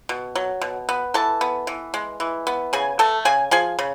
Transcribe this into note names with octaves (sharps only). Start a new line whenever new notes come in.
B2
F#3
B2
B3
E3 A4 A5
B3
E3
G#3
E3
B3
C#3 G#4 G#5
A3 A4 A5
C#3 G#4 G#5
F3 G#4 G#5
C#3